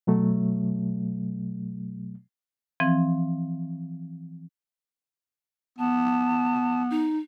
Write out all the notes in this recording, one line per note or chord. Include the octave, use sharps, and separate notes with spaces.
B2 F#3 A3
E3 F3 C4
B3 A5
D#4